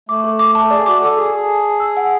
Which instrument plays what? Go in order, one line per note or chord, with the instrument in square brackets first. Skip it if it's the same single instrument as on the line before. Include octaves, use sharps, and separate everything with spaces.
[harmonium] A3 [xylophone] D6
[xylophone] A4
D6
A5
[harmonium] A4
[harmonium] G#4 [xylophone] D5
[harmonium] F#4 [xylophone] D6
[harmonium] A4 [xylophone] D5
[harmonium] G#4 [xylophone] D6
[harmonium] G#4 [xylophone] A5
[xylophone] A5
A5
E6
F#5